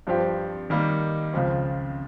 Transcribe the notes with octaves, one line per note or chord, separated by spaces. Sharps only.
G2 F3 C4 G4
D#3 G3 A#3 D#4
C#2 C#3 F3 C4